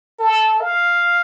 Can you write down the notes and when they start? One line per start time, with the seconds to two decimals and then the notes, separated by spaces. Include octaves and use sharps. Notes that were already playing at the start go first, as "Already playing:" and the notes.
0.19 A4
0.61 F5